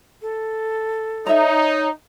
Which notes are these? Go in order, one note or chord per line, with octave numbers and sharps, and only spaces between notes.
A4
D#4 C#5 E5 A#5